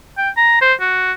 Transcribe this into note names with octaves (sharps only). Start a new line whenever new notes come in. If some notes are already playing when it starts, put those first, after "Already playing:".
G5
A#5
C5
F#4